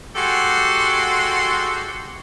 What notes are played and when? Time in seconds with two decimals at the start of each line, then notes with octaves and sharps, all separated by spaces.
0.16 G#3 F#4 G4 A4 F#5 C6